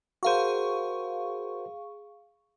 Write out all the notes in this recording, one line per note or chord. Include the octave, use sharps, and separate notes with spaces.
F#4 G#4 A#4 C5 F5 C#6